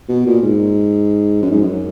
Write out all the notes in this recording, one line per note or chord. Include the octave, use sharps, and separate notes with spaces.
B2
A#2
G#2
F#2
G#2
F#2